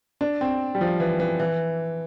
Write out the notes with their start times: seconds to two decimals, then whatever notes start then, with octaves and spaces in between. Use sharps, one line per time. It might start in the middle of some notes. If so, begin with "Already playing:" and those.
0.21 D4
0.41 C4
0.75 G3
0.81 F3
1.00 E3
1.20 E3
1.40 E3